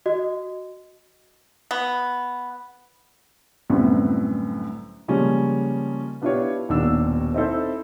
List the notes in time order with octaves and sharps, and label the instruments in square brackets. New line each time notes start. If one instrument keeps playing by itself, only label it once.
[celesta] F#4 D#5
[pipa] B3
[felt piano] C2 F#2 A2 D3 B3 C4
[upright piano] C#3 F3 G3 G#3 A#3 C#4
B3 D4 E4 F4 G4 C#5
D#1 D#2 B2 D4 E6
C4 D#4 E4 A4 C5